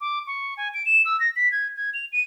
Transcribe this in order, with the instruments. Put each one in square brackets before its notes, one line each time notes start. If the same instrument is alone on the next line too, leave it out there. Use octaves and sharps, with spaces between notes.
[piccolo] D6
C#6
G#5
D7
E7
E6
A#6
B6
G#6
G#6
F7
D#7